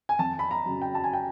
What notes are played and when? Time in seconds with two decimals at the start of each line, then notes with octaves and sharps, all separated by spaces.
0.09 G#5
0.19 F2 A5
0.39 B5
0.51 A#5
0.66 C#3 F#3
0.82 G5
0.95 A5
1.04 G#5
1.13 G5